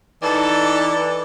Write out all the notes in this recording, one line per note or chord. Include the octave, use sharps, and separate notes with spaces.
E3 D#4 A4 D5